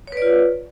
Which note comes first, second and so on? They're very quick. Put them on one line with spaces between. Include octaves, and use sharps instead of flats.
C#5 B4 D5 F4